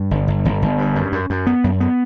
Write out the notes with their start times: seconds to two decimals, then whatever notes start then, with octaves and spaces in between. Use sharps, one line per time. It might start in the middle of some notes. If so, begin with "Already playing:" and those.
Already playing: G2
0.11 G1
0.28 G1
0.45 G1
0.62 G1
0.78 G2
0.95 F#2
1.12 F#2
1.30 F#2
1.47 B3
1.64 F#2
1.80 B3